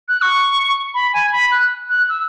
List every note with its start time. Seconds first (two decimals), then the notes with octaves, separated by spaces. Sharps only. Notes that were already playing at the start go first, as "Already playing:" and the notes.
0.09 F#6
0.22 C#6
0.94 B5
1.13 G#5
1.32 B5
1.52 F#6
1.89 F#6
2.09 E6